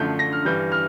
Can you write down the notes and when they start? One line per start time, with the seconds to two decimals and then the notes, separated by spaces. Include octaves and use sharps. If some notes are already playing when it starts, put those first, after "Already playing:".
Already playing: F#2 D3 F3 A3 G6
0.19 A#6
0.33 F6
0.45 G2 E3 G3 G6
0.72 F6